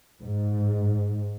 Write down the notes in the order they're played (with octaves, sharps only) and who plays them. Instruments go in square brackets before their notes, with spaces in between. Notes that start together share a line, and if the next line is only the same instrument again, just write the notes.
[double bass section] G#2